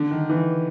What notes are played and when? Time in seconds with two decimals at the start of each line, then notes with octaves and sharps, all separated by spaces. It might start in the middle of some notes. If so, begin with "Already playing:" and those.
Already playing: D3
0.11 D#3
0.29 E3